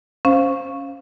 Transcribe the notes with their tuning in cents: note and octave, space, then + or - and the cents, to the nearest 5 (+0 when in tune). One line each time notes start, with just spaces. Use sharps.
C#4 +0 C5 +0 F5 +0